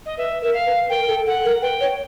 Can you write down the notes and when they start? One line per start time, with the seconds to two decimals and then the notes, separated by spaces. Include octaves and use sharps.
0.06 D#5
0.17 B4 E5
0.42 A#4 E5
0.53 F5
0.66 B4
0.90 A#4 G5
1.01 A#4
1.08 A4
1.26 A4 F#5
1.44 A#4
1.62 B4 G5
1.81 C#5